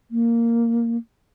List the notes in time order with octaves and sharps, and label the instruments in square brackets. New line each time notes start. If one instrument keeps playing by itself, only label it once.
[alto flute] A#3